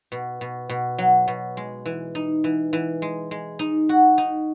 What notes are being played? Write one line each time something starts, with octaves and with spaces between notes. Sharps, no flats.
B2
B2
B2
F#3
B2
G#3
E3
D#4
E3
E3
G#3
G#3
D#4
F#4
D#4